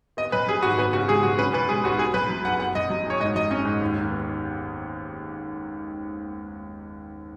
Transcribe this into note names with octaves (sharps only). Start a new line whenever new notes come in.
B3 D#5
F#2 B4
F#3 G#4
G#1 F#4
B3 B4
C#3 F#4
G#3 G#4
F#2 F#4
C#4 B4
B2 B4
G#3 G#4
B1 F#4
B3 G#4
F#2 B4
F#3
F#1 F#5
B3 F#5
F#2 D#5
F#3
F#1 C#5
G#2 D#5
F#3 D#5
C#4 D#5
G#2
D#2
D#3
B3